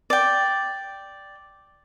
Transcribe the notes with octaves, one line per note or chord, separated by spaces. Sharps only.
D5 G5